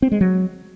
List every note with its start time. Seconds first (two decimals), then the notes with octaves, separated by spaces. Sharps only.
0.02 C4
0.12 G#3
0.21 F#3